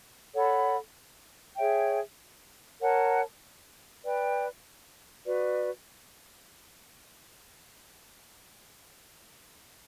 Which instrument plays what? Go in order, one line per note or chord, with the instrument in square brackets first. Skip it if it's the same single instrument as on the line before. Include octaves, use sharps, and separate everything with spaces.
[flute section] A4 C#5 F#5 B5
G#4 C#5 E5 G5
A#4 C#5 F#5 A5
B4 D5 G5
F#4 B4 D5